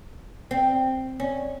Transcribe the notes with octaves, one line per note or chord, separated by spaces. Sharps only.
C4
C#4